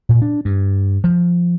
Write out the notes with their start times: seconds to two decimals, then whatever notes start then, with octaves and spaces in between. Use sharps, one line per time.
0.09 A#2
0.22 D4
0.45 G2
1.04 F3